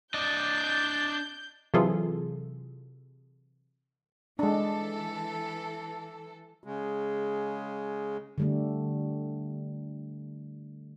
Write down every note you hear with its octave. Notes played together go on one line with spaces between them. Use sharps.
D4 D5 D#5 A5 G6
C3 E3 F#3 F4 G#4 A4
E3 G#3 D4 A4
C#3 G#3
D3 G3 A3